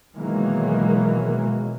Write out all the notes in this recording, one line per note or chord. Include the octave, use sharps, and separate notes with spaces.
B2 D#3 E3 F#3 G#3 A#3